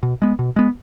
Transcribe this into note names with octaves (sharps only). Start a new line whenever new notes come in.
B2
G#3 B3
B2
G#3 B3